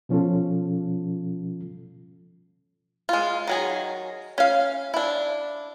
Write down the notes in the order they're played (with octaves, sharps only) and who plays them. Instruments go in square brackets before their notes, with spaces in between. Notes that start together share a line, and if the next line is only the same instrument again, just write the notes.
[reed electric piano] B2 F3 C#4 F4 A4
[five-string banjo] G#3 F4
D#3 F#3 G#4
C#4 F5
D4 E4